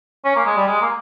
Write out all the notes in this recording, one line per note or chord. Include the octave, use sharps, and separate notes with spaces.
C#4
A#3
G#3
G3
G#3
A#3